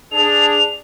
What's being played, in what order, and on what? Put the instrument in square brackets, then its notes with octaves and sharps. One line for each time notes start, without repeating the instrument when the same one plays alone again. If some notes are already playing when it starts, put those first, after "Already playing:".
[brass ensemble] D4 G#4 [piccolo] F7